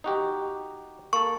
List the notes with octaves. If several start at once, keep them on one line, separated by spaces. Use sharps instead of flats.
D#4 F#4 G4
A#3 A4 C#6